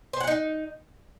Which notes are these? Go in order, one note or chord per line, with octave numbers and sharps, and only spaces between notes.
C5
F#5
D#4